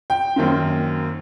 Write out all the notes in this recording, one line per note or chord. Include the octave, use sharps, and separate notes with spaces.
G5
F#2 D#3 A#3 C4